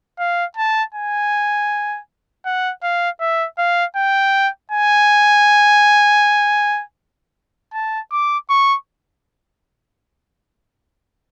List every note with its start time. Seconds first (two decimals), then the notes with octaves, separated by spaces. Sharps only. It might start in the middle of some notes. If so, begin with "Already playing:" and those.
0.19 F5
0.57 A5
0.94 G#5
2.46 F#5
2.83 F5
3.21 E5
3.59 F5
3.96 G5
4.72 G#5
7.74 A5
8.12 D6
8.50 C#6